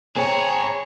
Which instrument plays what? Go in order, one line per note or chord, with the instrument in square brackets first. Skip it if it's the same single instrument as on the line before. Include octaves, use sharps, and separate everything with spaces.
[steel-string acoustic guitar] C4 [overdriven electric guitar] G#4 [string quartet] C#5 [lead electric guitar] A5 A#5